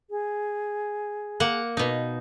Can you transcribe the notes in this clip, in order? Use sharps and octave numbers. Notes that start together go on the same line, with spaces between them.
G#4
A#3 F#5
B2 D#4